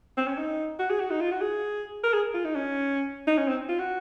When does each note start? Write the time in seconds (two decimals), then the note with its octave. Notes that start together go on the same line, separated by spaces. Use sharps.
0.17 C4
0.27 C#4
0.37 D#4
0.79 F#4
0.90 G#4
1.00 F#4
1.10 D#4
1.21 F4
1.31 F#4
1.41 G#4
2.03 A#4
2.13 G#4
2.34 F4
2.45 D#4
2.55 C#4
3.27 D#4
3.38 C#4
3.48 C4
3.68 F4
3.79 F#4